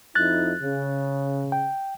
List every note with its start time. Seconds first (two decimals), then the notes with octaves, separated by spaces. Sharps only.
0.15 F2 D#4 E4 F#6 A6
0.61 C#3
1.52 G5